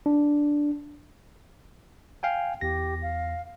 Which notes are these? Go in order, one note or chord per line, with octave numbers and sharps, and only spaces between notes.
D4
F5 G5 G#5
E2 G4 A#6
F5